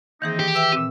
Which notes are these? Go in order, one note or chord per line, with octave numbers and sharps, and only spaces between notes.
D#3 E3 A#3 C4 D#4 G#4
G4
B4 E5 G5 E6
A#2 C4